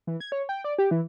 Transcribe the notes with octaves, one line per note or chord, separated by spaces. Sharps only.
E3
G#6
C#5
G5
D5
G4
E3